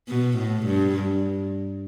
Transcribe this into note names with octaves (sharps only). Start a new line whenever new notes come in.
B2
A2
G2